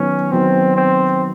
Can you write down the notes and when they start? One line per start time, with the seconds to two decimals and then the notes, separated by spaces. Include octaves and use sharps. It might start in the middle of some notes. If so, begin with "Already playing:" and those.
Already playing: D#3 F#3 B3 C#4
0.31 D#3 F#3 B3 C4
0.76 C4